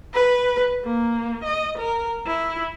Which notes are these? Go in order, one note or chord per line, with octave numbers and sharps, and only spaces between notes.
B4
A#3
D#5
A#4
E4